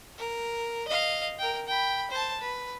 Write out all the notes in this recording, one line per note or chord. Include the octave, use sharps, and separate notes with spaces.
A#4
D#5 F5
A#4 G5
G5 B5
C5 A5
B4